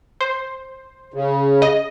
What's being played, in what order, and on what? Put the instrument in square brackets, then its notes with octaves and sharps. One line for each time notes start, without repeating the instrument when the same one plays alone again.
[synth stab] C5
[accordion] C#3
[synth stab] D#5